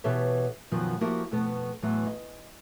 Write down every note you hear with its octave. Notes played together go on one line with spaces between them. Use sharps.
B2 E3 G4 A4 C#5 E5
F#2 B2 D#3 F3 F#3
F3 A#3 E4 F#4 G4 A#4
F2 B2 A3 B3
E2 A2 E3 F#3
D#5